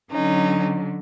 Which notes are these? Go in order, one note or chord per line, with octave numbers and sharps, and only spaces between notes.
D3 F#3 C#4 D#4